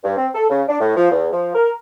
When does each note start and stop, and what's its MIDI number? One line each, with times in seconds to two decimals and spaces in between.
0.04 0.13 43
0.17 0.28 60
0.35 0.46 69
0.50 0.63 49
0.68 0.78 62
0.80 0.95 45
0.96 1.09 53
1.11 1.28 40
1.32 1.55 53
1.55 1.72 70